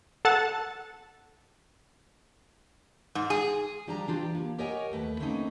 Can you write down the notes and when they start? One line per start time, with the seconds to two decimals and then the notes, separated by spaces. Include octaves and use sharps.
0.25 A4 F#5 A5
3.15 G#2
3.30 G#4
3.87 F3 G3 D4 G4 A5 A#5
4.07 E3 D4 F4 G4
4.35 A#3
4.59 G4 A#4 C#5 D#5 F#5 G#5
4.92 D#2 A3 B4
5.20 D3 A3 A#3 C4 C#4 D#4